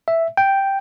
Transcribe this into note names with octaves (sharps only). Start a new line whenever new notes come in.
E5
G5